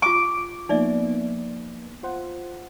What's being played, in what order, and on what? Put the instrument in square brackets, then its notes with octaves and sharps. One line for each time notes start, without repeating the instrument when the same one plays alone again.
[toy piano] F4 C#6 [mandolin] D6
[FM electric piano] F3 A#3 B3 [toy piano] D#4 D5 E5
[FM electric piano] F4 C5 F#5